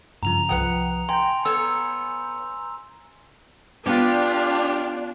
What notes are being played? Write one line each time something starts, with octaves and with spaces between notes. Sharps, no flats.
G2 C#3 F3 A#5 F7
C2 F3 B4 F#5 G5 D#6
G5 G#5 A#5 C6 G6
B3 A4 C#5 E6
B3 D4 F4 G4